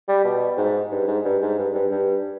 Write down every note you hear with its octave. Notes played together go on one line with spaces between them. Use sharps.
G3
B2
G#2
G2
G#2
G2
G#2
G2
G2
G2